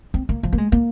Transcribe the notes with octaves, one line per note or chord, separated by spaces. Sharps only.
C4
A#3
F3
A#3
G#3
A#3